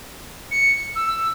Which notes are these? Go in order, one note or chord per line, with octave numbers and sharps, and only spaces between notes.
C#7
E6